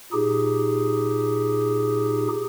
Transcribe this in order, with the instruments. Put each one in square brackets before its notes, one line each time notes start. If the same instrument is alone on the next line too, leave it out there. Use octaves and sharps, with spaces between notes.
[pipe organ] A#2 D#4 G4 G#4